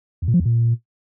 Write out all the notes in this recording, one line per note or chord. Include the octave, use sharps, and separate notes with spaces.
E2
A#2
F3
E2
A#2